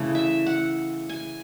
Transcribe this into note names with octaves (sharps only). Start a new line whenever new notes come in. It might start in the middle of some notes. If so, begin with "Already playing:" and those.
Already playing: C#3 E3 A3
E5
F#5
G#5